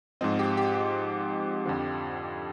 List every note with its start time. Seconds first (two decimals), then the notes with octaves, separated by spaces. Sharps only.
0.21 G#2 F3 C4 D#5
0.39 G4
0.57 G4
0.75 G4
1.66 F2 D3 F3